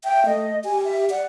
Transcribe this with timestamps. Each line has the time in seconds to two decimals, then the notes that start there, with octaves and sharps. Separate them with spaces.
0.04 E5 G5
0.26 A3 D#5
0.65 G4 G#5
0.85 E5
1.10 D5 F#5